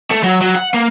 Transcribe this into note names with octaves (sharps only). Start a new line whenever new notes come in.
A3
F#3
F#3
F#5
A#3